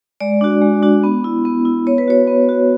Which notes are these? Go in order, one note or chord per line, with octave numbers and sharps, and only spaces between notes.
G#3 D5
D4 F#4
G#3
D4 F#4
B3
E4
B3
E4
B3 C#5
B4
F#4 C#5
B3
F#4